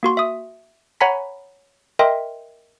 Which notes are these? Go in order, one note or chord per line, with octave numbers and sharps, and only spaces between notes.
A#3 F#4 C6
E5 D#6
C#5 F#5 G#5 A#5 B5 B6
A#4 D#5 E5 G5 C6